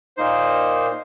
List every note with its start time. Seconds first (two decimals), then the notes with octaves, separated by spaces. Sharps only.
0.17 A#2 A#3 D#4 C5